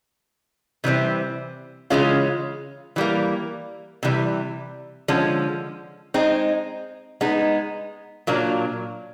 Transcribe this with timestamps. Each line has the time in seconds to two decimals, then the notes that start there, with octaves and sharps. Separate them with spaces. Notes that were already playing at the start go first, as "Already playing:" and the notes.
0.84 C3 E3 G3 C4
1.90 C#3 E3 G#3 C#4 F4
2.96 E3 G3 A#3
4.03 C3 E3 G3
5.08 D3 F3 G#3 C#4
6.14 G#3 C4 D#4
7.21 G#3 B3 D#4
8.27 A#2 F#3 A#3 D4